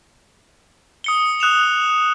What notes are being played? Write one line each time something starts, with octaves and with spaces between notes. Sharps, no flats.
D#6 C#7 G7
D#6 F#6 E7 F7